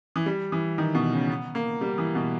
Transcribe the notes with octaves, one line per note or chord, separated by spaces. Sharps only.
E3
G3
E3
D#3
B2
C#3
B3
A#3
G3
E3
B2